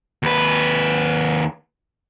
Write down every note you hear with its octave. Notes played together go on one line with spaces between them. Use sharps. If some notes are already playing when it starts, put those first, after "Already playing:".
D#2 B4